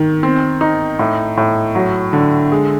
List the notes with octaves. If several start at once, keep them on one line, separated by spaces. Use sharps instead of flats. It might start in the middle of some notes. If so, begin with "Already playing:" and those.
Already playing: D#3
C4
D#4
A2
A2
F#3
D3
G#3